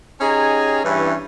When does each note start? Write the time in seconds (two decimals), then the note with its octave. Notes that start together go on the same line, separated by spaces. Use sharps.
0.21 C#4 D#4 G4 G#4 G#5 A#5
0.84 G2 E3 C#4